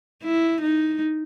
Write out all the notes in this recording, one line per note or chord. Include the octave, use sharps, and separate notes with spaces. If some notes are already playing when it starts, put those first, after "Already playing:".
E4
D#4